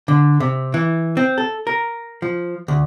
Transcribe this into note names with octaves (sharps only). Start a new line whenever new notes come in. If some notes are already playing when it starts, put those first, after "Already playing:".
D3
C3
E3
C4
A4
A#4
F3
D2